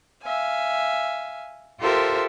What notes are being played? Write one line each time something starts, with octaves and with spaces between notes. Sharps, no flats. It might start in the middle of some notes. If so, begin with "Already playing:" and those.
E5 F5 G#5
F4 G4 A4 A#4 C5 E5